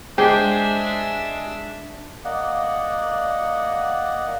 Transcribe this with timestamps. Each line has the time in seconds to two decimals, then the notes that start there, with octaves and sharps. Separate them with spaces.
0.18 G#3 D4 G4 C5 E5 G5
2.25 A#3 D5 D#5 F#5